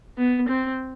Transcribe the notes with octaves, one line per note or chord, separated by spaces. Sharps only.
B3
C4